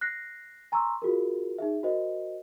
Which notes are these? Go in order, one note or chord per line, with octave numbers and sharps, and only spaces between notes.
F#6 A#6 C7
G#5 A#5 C6 C#6 E6
F4 F#4 G#4 A#4
D#4 G#4 E5
F#4 A#4 C5 D#5